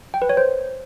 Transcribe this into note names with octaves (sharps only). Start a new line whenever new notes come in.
G5
B4
C#5
C5